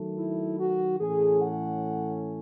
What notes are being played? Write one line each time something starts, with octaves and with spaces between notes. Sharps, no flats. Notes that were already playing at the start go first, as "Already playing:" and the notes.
Already playing: D#3 F#3 A3
E4
F#4
A2 E3 A3 C#4 G#4
F#5